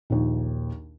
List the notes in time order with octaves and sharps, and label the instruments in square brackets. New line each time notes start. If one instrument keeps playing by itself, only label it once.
[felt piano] A#1 D#2